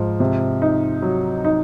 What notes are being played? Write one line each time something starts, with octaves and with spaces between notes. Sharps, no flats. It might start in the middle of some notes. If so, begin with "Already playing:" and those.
Already playing: G#2 F3
C3
D#4
F#3
D#4